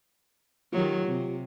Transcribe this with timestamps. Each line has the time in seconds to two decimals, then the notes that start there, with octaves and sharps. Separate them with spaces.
0.73 D#3 F#3 F4 G4
1.07 C3